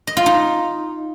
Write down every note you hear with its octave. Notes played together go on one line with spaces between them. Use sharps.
D#5
F4
D#4